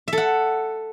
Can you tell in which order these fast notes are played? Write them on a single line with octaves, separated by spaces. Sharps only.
E5 A4 F#5